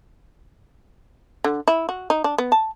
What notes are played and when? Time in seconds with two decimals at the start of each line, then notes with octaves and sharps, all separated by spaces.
1.44 D3
1.68 E4
1.89 F#4
2.10 D#4
2.24 D4
2.38 B3
2.52 A5